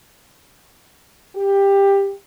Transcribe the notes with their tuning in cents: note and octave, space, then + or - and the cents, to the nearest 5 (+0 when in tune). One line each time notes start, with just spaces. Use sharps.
G4 +15